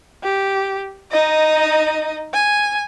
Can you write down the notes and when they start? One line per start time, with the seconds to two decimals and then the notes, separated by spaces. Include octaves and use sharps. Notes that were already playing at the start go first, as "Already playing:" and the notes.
0.23 G4
1.11 D#4 D#5
2.33 G#5